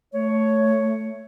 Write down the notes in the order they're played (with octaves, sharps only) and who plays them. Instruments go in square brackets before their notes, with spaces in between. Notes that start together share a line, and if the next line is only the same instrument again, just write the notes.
[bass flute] A3 [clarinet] C#5